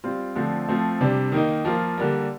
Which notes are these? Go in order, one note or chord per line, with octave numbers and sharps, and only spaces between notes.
G3 C4 F4
D3 F3 A3 C4
F3 A3 C4
C3 G3 D4
D#3 A#3 D#4
F3 A#3 F4
D3 G3 A#3